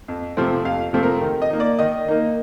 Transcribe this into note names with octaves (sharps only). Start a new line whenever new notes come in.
F2
C3 F3 A3 C4
F2 F5
C3 F3 A3 C4
A#4
D#3
D#5
A#3 D#4
D5
D#3 D#5
A#3 D#4